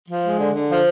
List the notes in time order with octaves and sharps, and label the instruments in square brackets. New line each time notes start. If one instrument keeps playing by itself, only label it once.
[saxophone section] F3
G#3
D3
D3
F3